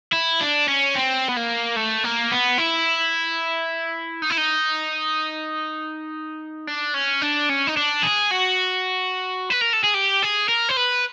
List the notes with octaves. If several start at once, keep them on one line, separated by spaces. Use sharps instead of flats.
E4
D4
C#4
C4
B3
A#3
A3
A#3
B3
E4
D#4
E4
D#4
D4
C#4
D4
C#4
D#4
D4
G#4
F#4
B4
A#4
A4
G#4
G4
G#4
A#4
C5
B4